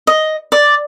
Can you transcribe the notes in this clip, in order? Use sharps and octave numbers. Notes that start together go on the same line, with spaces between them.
D#5
D5